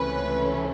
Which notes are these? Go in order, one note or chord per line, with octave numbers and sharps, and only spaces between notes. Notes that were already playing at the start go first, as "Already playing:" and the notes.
Already playing: C#2 C3 E3 A3 C#4 B4